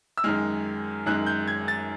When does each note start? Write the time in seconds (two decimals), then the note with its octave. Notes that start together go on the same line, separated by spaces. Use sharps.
0.18 E6
0.24 F#2 D#3 G#3 F6
1.06 F#2 D#3 G#3 F#6
1.27 G6
1.48 G#6
1.68 A6